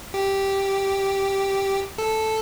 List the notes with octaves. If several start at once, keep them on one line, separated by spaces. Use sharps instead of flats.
G4
A4